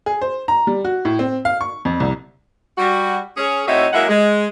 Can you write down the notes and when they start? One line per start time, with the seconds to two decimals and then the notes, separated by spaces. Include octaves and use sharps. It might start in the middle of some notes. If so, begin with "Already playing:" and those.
0.06 G#4
0.22 C5
0.48 A#5
0.67 G3
0.85 F#4
1.05 A2
1.19 C4
1.45 F5
1.61 C#6
1.85 F2
2.00 C2
2.78 G3 F#4
3.37 C#4 G#4
3.67 A2 C4 D#4 F#4 C#5 E5
3.93 F#3 G#3 A#3 E4 E5 F#5
4.09 G#3